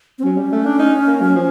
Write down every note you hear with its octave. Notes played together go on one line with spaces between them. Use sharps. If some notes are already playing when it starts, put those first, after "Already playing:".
C4
F#3 C#4
G3
A3
D4
D#4
A#3
F#3
F3